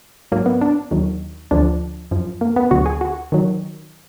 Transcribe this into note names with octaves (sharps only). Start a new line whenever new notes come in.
G#2 F#3 A#3
B3
D4
D#2 D#3 F#3
D2 D3 F3 D4
F#2 F3
A#3
B3
D2 D3 F#3 F#4
G#4
F#4
D#3 F#3